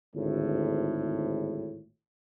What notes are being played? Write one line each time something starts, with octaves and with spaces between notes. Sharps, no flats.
G#1 D2 A2